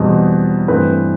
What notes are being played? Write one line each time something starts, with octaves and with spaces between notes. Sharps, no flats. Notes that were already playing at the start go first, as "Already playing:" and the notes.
Already playing: E2 B2 G3 C4
G2 E3 A3 C4 B4